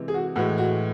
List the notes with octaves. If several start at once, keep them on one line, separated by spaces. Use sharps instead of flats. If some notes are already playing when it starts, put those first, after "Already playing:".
Already playing: C3 E3 G#3
G#4
F#4
A2 E3 G#3 F#4
F#4